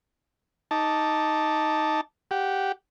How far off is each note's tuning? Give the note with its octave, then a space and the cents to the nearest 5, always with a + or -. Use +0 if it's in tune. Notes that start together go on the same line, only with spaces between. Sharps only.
D#4 +10 A5 +0 D6 +0
G4 -5 F#5 +0